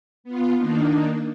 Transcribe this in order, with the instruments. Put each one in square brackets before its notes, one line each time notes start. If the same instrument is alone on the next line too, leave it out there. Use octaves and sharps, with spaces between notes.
[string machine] B3 F4
D#3 A#3 D4 D#4